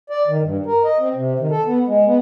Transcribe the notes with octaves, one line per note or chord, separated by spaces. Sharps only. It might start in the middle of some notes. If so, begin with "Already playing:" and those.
D5
D#3
G2
A#4
D#5
C4
C3
D#3
A4
B3
G#3
B3